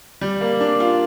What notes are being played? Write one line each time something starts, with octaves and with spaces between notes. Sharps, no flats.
G3
A#3
D4
F4